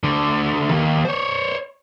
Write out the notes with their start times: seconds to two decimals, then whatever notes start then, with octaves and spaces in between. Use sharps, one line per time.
0.04 D2 D3
0.71 D#3 A#3
1.05 C5 C#5